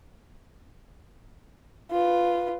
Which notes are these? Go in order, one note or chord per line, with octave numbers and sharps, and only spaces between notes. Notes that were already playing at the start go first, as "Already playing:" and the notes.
F4 B4